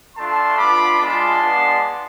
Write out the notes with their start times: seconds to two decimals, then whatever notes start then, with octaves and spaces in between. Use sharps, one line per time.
0.16 A3 D4 F4 A5 C6
0.57 B3 D4 F4 B5 D6
0.99 G#3 D4 F4 A5 C6
1.40 G#3 B3 D4